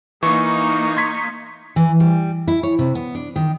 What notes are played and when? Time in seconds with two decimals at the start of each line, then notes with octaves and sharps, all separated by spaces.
0.23 E3 A#3 D#4 C#6
0.97 C6 G#6 B6
1.76 E3
2.00 G3
2.48 E4
2.63 C#5
2.79 C3
2.95 B3
3.15 D4
3.36 D#3